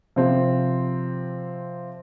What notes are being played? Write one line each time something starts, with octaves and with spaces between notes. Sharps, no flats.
C3 F3 C4